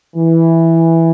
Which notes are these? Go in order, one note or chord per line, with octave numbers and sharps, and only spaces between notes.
E3